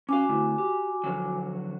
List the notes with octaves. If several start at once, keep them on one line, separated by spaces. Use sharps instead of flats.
C#4 F#4 F5 G#5 D6
D3 A3 E4
G4
D3 F3 F#3